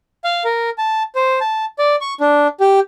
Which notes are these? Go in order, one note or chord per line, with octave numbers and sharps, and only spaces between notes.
F5
A#4
A5
C5
A5
D5
C#6
D4
G4